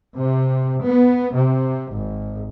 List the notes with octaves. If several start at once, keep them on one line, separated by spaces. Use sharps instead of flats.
C3
B3
C3
G#1